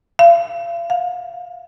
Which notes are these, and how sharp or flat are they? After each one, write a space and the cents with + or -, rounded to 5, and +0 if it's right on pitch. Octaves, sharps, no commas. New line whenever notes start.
F5 -40
F5 +40